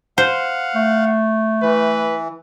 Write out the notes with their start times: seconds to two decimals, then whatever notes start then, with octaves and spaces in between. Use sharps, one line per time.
0.18 C5 F5 F#5
0.75 A3
1.63 E3 B4